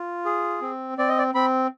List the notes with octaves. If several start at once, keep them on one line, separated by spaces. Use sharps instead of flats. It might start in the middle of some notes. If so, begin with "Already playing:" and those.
Already playing: F4
G#4
C4
C4 D5
D#5
D5
C4 B5